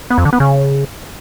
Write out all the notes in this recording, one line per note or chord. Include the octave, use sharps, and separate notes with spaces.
B3
F2
D3
B3
C#3